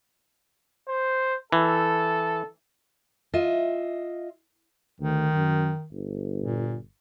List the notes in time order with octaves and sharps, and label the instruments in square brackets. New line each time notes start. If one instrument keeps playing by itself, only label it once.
[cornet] C5
[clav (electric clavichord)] E3 [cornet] A4
[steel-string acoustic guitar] F4 D#5 E5
[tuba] D2 [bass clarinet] D#3
[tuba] F#2
G1
[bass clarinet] A#2